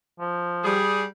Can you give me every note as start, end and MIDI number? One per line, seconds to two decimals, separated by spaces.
0.20 0.76 53
0.64 1.04 55
0.64 1.04 68